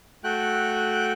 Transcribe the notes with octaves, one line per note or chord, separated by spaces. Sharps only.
A3 F#4 G5 F#6